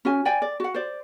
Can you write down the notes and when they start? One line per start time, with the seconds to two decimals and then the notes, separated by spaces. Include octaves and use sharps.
0.05 C#4 F#4 G#5
0.25 D5 G5 G#5
0.42 D5
0.60 F#4 F#5
0.74 C5 D5